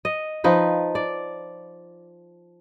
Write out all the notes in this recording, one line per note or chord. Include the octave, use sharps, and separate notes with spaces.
D#5
F3 D#4 B4
D5